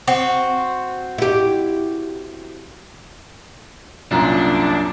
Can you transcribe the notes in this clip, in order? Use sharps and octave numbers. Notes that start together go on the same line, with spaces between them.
C4 F#4
E4 G4
C2 F#2 A#2 D4 F4 A#5